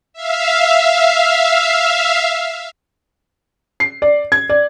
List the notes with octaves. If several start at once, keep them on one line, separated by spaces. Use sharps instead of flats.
E5 F5
C7
D5
G#6
D5